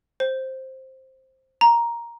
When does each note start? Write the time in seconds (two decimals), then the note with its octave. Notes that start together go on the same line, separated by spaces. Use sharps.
0.20 C5
1.61 A#5